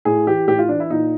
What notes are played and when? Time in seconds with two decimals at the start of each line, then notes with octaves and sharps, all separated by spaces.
0.05 A2 G#4
0.27 E3 G4
0.47 A2 G4
0.59 F4
0.68 E3 D4
0.80 E4
0.90 A#2 D#4